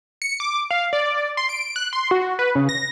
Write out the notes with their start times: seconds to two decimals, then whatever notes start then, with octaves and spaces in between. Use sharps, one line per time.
0.22 C#7
0.40 D6
0.71 F5
0.93 D5
1.37 C6
1.49 D7
1.76 F#6
1.93 C6
2.11 F#4
2.39 B4
2.55 C#3
2.69 A#6